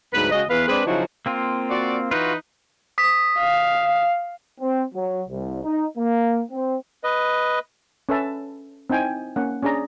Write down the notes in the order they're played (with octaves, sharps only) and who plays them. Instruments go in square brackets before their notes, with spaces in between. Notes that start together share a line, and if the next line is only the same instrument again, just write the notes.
[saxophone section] D2 G#2 F#3 B4
C#3 G#3 F#4 D#5
E2 B4 F5
G#3 C4 D4 G#4 B4
C#3 F3 F#3 D#4 E4 F#4
[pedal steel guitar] A#3 C4 F4
[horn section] F#4 D5
[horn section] E3 D#4 B4 [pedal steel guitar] F4 F#4
[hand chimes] D#6 B6
[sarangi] F5
[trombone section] C4
F#3
C2
D#4
A#3
C4
[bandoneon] B4 D#5
[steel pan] C#4 A4 B4 E5 A5
C4 D#4 E4 G5 G#5
A#3 C#4 F#5
C#4 D4 G#4 D5 A#5